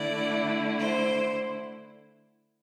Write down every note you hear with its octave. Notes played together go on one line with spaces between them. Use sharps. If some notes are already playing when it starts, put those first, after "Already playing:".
Already playing: D3 A3 E4 D5
C5